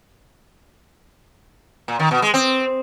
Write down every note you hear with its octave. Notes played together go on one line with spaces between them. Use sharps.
A#2
D#3
B2
G#3
C4